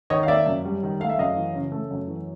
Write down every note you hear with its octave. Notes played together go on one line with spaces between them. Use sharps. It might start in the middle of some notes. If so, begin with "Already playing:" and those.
D#3 C#5 D#5
F5
A#3 D5 E5
F#2
G3
D#3
A3 F5
E5
F#2 D#5 F5
E3
C#3
A3
F#2
E3